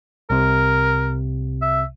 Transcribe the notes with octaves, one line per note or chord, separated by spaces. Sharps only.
C2 C3 A#4
E5